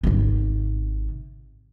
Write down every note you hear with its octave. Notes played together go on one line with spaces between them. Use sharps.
G#1 C3